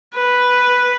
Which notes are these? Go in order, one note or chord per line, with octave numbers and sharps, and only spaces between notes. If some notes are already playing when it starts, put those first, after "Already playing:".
B4